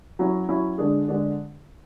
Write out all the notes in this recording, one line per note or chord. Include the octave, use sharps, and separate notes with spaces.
F#3 C#4 E4
F#3 C#4 E4
D3 G#3 D4 G#4
D3 G#3 D4 G#4